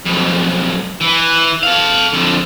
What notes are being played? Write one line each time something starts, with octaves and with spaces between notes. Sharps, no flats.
B1 F2
E3
A4 F5
F2 D3